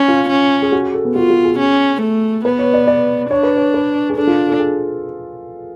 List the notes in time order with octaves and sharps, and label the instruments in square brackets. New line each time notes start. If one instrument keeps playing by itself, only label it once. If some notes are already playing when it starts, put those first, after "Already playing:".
Already playing: [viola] C#4
[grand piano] F4
[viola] C#4
[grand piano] G#4
F#4
G#4
A4
B3
[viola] F4 [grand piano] F#4
[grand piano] F#4
G#4
[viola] C#4
A3
[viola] B3 [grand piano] B4
[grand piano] C#5
D5
D5
[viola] D4 [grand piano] C#5
[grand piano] B4
C#5
B4
G#4
[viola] D4 [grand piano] A4
[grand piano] F4
A4
G#4